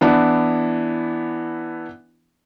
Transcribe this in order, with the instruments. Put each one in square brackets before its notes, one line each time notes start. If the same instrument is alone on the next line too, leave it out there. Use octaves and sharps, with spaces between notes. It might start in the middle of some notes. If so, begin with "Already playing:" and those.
[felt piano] E3 B3 D4 E4